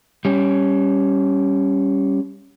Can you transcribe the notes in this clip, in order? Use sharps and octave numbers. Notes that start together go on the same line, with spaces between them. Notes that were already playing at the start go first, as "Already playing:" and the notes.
G3 C#4